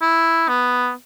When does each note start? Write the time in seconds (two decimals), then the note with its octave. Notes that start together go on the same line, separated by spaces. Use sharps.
0.02 E4
0.48 B3